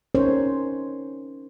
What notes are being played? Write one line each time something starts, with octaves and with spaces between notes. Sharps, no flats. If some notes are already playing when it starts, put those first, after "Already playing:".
C#4 D#4 A#4 C5 C#5